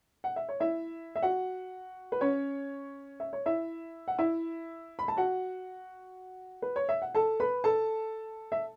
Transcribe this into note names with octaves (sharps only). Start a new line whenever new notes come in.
F#5
E5
C#5
E4 E5
E5
F#4 F#5
B4
C#4 C#5
E5
C#5
E4 E5
F#5
E4 E5
B5
A5
F#4 F#5
B4
C#5
E5
F#5
A4 A5
B4 B5
A4 A5
E5